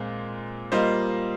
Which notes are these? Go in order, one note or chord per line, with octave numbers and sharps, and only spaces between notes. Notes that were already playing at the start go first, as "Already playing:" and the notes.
Already playing: A#2 G#3 C4
G3 A#3 F4 C5 D#5